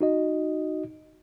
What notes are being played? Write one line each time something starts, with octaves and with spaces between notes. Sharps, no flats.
D#4 F#4 D#5